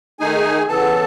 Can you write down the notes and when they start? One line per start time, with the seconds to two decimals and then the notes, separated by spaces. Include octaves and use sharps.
0.20 D#3 A3 D#4 G#4 G#5
0.68 C#3 E3 B3 A4 A5